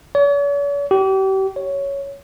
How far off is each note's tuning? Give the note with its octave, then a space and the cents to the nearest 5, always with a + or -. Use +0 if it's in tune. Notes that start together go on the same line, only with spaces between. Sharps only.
C#5 +45
G4 -35
C#5 +5